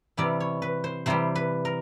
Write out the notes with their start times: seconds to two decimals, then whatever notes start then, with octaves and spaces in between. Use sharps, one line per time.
0.17 C3 E3 G3 D5
0.40 C#5
0.62 B4
0.84 C5
1.06 C3 E3 G3 C5
1.36 B4
1.65 A#4